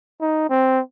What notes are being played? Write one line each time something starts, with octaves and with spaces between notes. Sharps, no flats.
D#4
C4